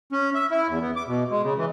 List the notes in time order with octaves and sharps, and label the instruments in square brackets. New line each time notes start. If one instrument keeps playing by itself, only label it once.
[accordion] C#4
E5
E4
E2
B3
D6
B2
G#3
C#3
E3